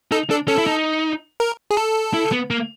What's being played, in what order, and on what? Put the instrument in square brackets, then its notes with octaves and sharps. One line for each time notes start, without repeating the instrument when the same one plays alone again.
[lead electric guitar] D#4 [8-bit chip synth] A4
[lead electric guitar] D4 [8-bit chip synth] A4
[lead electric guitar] C#4 [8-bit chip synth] A4
[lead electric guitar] E4
D#4
[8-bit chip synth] A#4
G#4
A4
[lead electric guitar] E4
B3
A#3